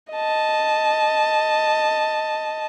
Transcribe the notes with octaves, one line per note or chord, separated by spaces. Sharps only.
D#5 A5